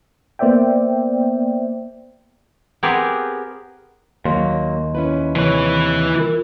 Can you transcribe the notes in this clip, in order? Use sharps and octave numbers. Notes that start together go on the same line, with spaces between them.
A#3 B3 C5 D5 E5 G5
B3 C4 G4 G#4 A#4 B4
D#2 F#3 A#3 C6
C#4 E4 B4
C3 E3 B4 C#5
F4 A#4